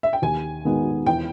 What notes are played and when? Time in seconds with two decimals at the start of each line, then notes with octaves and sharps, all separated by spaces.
0.03 E5
0.13 G5
0.22 D#2 G#5
0.65 D#3 G#3 B3 D#4
1.06 E2 G5